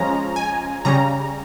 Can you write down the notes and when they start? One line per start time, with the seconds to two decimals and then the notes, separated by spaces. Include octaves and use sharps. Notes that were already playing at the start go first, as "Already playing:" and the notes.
Already playing: F3 G#3 C#4 A#5
0.36 G#5
0.85 C#3 G3 C#4 A#5